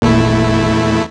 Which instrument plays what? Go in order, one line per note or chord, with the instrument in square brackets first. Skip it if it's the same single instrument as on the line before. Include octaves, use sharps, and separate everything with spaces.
[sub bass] G#1 [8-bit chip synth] E2 A3 E4 [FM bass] A#2